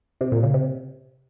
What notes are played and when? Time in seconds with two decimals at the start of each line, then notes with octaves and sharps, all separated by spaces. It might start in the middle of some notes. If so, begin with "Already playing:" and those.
0.21 C3
0.32 A#2
0.43 C#3
0.54 C3